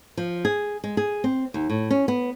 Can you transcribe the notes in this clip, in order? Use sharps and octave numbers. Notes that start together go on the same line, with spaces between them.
F3
G#4
G#3
G#4
C4
D#2
A2
C#4
B3